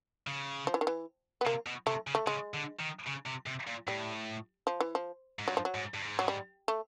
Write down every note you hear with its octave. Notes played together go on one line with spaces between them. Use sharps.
C#3
F3
E3
D#3
E3
B3
C3 A#3
B2
C3 A3
C#3
A3
C#3 G#3
D3
D#3
C#3
C3
C3
A#2
A2 G3
F3
E3
F3
G#2
G2 F#3
F3
F#3
G#2
G2
G#2
F#3
G3
A3